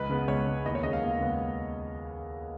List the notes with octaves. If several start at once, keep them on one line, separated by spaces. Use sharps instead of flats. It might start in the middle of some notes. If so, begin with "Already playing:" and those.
Already playing: C#2 B4
C#3 G#3 B3
C#2 C#5
C#3 G#3 B3
D#2 D#5
C#5
C#3 G#3 B3 D#5
F5
D#2
C#3 G#3 B3